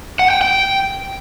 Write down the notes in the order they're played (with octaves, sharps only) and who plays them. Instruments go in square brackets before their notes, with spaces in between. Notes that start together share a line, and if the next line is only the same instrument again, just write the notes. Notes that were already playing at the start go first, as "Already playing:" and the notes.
[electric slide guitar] F#5
G5
G5